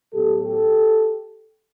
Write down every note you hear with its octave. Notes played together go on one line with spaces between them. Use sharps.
A2 F#3 B3 G4 A4
G4 A4